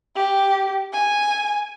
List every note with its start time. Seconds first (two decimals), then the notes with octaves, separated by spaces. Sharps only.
0.16 G4
0.93 G#5